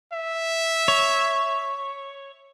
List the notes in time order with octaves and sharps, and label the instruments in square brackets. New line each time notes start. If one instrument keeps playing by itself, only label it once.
[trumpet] E5
[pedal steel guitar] C#5